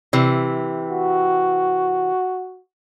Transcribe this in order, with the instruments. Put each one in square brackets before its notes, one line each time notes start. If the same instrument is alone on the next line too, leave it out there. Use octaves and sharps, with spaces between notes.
[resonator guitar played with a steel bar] C3 E3
[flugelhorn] F#4